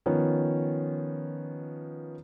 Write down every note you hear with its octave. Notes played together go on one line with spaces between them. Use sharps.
D#3 F3 B3 C#4